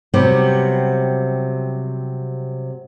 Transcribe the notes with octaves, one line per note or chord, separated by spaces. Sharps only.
C3 F#3 G3 B3 G4